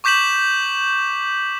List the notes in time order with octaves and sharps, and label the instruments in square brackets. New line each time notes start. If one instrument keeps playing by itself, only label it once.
[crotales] C#6 D6 G6 B6 E7 F#7